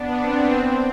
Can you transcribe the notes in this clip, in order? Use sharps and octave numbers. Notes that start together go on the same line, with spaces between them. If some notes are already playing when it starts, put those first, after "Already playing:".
Already playing: B3 D4
C4
C4